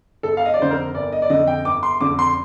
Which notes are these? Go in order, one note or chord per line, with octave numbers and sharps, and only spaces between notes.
G1 A4
F5
D#5
D5
F2 D3 C5
A#4
G1 D5
D#5
D5
F2 D3 D#5
G5
G1 D6
C6
F2 D3 D6
C6